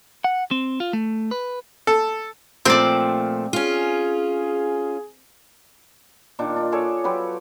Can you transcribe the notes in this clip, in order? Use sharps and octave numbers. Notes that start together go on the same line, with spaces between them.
F#5
C4
F4
A3
B4
A4
A#2 F3 A3 C4 D5
C#4 F4 G#4
A#2 D#3 D4
D4
G#4 A4 C#5 D5
F#3 F4 G4 B4